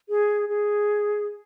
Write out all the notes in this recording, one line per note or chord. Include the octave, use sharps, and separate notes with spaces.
G#4
G#4